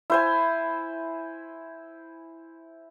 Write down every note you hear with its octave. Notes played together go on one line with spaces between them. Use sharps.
E4 C5 G#5